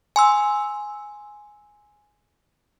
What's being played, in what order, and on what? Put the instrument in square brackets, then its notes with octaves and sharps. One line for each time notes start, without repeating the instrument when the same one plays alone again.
[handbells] G#5 C6 E6